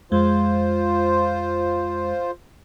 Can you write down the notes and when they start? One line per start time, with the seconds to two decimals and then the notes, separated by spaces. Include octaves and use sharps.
0.12 F2 G#3 F4 C5